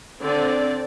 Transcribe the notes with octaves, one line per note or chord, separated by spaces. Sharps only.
D3 C4 D5